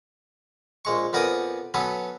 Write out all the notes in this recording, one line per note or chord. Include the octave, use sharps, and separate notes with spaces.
A#1 G#3 C#6
F2 B3 A#4 D5 G#5 D#6
F#3 B3 C#4 A4 B4